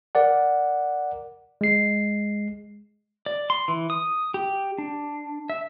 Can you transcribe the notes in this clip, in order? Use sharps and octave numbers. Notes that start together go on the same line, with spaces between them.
A#4 D5 F#5
G#3 C7
D5
C6
E3
D#6
G4
D4
E5